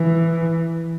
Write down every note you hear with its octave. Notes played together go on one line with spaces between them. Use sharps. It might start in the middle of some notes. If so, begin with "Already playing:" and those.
Already playing: E3